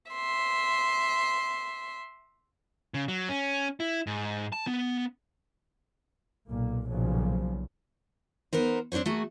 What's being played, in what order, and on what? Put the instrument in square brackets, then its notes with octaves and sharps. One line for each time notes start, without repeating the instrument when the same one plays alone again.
[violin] E5 C6
[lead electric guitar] C#3
F#3
C#4
E4
G#2
A5
B3
[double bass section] B1 A#2 A#3
B1 A#2 C#3 F3 F#3
[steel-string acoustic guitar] B3 D#4 A#4 C5
C4 D4 E4 C5 C#5
A3 A#3 F#4 G#4